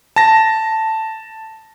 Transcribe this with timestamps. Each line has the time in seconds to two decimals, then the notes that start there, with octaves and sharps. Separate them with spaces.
0.16 A5 A#6